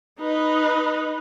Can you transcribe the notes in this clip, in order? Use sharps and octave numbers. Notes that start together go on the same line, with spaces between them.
D#4 B4